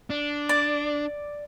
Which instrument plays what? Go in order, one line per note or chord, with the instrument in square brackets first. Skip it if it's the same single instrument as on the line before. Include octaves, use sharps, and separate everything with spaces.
[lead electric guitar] D4
[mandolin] D5